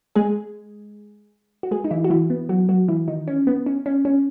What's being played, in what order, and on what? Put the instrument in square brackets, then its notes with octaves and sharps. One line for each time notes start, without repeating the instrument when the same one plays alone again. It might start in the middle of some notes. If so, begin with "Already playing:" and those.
[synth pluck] G#3 G#4
F#4
G#3 G#4
D#4
E3 E4
F#4
E3 E4
B3
F#3 F#4
F#3 F#4
E3 E4
D#3 D#4
C#4
B3
C#4
C#4
C#4